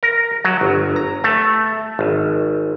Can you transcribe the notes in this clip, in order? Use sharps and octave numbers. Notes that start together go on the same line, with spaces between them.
A#4
F#3
G1
A#5
A3
G#1